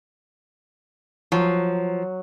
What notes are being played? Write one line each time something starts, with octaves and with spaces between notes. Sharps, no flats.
F3 F#3